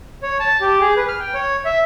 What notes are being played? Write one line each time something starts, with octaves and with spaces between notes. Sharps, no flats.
C#5
A5
G4
G#4
B4
F6
G5
C#5
E5